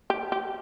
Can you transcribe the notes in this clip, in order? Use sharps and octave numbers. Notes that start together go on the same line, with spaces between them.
G4
G4